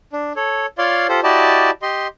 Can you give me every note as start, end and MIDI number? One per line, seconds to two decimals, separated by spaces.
0.13 0.33 62
0.36 0.66 69
0.36 0.66 73
0.78 1.07 65
0.78 1.07 73
0.78 1.07 74
0.78 1.07 77
0.78 1.07 84
1.09 1.20 65
1.09 1.20 67
1.09 1.20 69
1.09 1.20 72
1.23 1.71 64
1.23 1.71 66
1.23 1.71 67
1.23 1.71 74
1.23 1.71 75
1.23 1.71 81
1.82 2.08 67
1.82 2.08 75
1.82 2.08 84